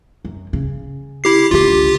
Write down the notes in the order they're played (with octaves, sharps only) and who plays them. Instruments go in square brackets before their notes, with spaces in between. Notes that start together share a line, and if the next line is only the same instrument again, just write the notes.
[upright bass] F#2
C#3
[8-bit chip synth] E4 G4 C7
[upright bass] C#2 D3 [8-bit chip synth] F4 G4